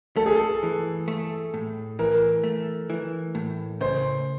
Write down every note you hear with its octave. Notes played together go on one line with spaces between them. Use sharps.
A3 A4
G#4
A4
E3
A3
A2
E3 A#4
A3
E3
A2
C#3 C5